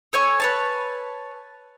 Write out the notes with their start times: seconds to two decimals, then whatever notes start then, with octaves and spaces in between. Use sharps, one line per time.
0.13 A4 C#5 G#5 C#6
0.40 B4 C#5 A5